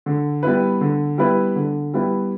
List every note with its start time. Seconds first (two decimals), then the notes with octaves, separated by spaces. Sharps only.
0.06 D3
0.43 G3 B3 E4 B4
0.81 D3
1.18 G3 B3 E4 B4
1.56 D3
1.94 G3 B3 E4 B4